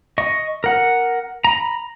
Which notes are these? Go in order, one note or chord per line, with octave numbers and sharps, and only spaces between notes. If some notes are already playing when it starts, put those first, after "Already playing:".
D#5 C#6
A#4 F#5
A#5 B5